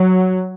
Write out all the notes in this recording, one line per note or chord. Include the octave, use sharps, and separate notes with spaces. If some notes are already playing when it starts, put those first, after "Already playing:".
Already playing: F#3